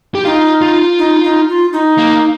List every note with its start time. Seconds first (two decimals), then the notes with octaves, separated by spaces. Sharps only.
0.15 G4
0.25 D#4 F4
0.63 F4
0.99 D#4
1.23 D#4
1.49 F4
1.73 D#4
1.98 A#3